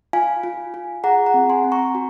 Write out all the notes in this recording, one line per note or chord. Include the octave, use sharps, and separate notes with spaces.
F4 F5 G#5
F4
F4
G#4 F#5 A#5
F#5 A#5
C4
G#5 C6
C4
A#5 C#6
F#4